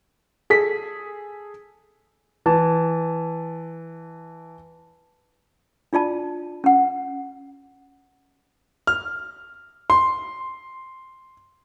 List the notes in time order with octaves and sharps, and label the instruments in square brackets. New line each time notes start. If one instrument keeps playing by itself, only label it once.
[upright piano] G#4 A4 B6
[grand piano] E3 A5
[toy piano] D4 F4 D5 A5
C#4 F#5
[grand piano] F6
C6